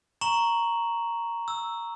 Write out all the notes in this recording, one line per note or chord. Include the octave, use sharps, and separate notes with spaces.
A#5 C#6 E7 F#7
E6